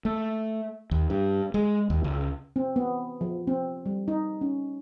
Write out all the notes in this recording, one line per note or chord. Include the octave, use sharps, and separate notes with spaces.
A3
D#2
G2
G#3
D#2
C#2
C4
B3
F3
C4
G3
D#4
C#4